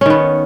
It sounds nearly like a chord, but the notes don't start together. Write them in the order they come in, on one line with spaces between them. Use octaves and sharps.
C#4 D#3 B3